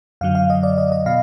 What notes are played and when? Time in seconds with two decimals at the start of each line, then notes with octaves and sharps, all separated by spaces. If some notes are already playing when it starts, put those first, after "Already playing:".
0.21 F#2 D3 F#3 F5
0.35 F5
0.50 D#5
0.63 D5
0.78 D#5
0.92 D#5
1.06 B2 F5